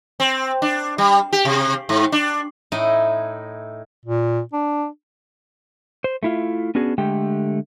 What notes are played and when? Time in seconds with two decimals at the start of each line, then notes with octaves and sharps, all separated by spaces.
0.20 C4
0.62 D4
0.98 G3
1.33 G4
1.45 C3
1.89 G#2
2.12 D4
2.72 A2 D#4 E4 D#5
4.05 A#2
4.53 D4
6.04 C5
6.23 A3 E4 F4
6.75 B3 C#4 D4 F#4 G#4
6.98 D3 G#3 A3 G4 G5